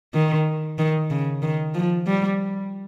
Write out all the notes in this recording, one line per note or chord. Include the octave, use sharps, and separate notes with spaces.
D#3
D#3
C#3
D#3
F3
G3